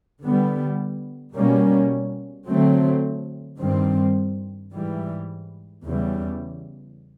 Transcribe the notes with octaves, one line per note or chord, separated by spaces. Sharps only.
D3 G3 B3
B2 G3 A#3 C#4
D3 F#3 A3 C4
G2 D#3 G3 C4
G#2 E3 G3
E2 C#3 E3 G3